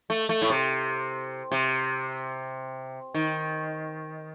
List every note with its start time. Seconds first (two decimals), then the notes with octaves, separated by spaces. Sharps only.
0.10 A3
0.29 A3
0.42 A2
0.50 C3
1.51 C3
3.14 D#3